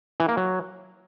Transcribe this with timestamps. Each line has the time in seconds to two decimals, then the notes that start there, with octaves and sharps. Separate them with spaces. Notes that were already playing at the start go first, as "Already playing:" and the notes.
0.20 E3
0.28 A#3
0.37 F#3